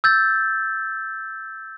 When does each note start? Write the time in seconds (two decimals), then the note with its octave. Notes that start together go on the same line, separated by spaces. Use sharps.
0.04 E6 G6 A6